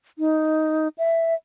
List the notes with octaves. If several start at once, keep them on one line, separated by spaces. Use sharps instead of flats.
D#4
E5